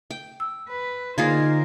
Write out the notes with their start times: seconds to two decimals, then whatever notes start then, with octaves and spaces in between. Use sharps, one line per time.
0.11 G5
0.40 E6
0.70 B4
1.18 D3 A#3 D#4 F4 G#4 A#4 C5 G#6